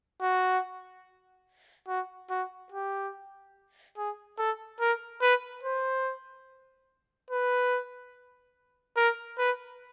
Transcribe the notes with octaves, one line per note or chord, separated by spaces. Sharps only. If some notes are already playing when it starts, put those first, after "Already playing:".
F#4
F#4
F#4
G4
G#4
A4
A#4
B4
C5
B4
A#4
B4